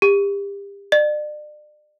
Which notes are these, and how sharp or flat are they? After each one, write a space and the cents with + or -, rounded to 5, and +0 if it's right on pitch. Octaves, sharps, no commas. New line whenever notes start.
G4 +30
D5 +35